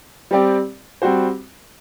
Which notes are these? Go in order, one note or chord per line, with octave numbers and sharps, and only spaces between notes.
G3 C4 G4 D5
G3 C4 F#4 C5